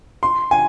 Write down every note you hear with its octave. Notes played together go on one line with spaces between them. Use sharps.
C6
G#5